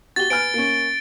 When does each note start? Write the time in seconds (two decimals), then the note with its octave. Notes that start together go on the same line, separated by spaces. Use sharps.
0.16 F#4 G4 A6 G7
0.30 B4 G#5 F6 D7
0.54 A#3 C#4